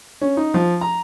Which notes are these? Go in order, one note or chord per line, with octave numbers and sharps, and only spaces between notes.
C#4
D#4
F3
A#5